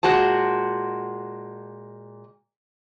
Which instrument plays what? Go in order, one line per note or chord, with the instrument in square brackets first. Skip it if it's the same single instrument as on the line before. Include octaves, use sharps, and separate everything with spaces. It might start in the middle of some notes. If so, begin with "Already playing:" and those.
[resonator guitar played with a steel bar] A#2 G#3 F#4 C5 A5